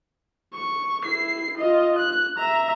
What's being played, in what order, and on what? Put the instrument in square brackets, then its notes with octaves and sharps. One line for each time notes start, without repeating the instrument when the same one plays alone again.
[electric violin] C#6
E4 C7
F4 D#5
F#6
E5 A#5